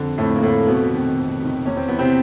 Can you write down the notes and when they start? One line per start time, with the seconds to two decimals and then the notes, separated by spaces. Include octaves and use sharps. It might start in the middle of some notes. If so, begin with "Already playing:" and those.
Already playing: F2 D3
0.18 F2 A2 A3
0.35 A#3
0.43 A2 D3 A3
0.67 F2 B2 B3
0.93 C3 D#3
1.16 F2
1.41 C3 D#3
1.66 E2 C#4
1.77 C4
1.88 C3 E3 B3
1.99 C3 C4